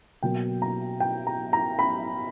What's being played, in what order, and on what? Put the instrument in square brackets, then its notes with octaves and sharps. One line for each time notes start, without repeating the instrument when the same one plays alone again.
[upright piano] B2 F#3 A#3 G5
A#5
G5
A#5
A#5
B5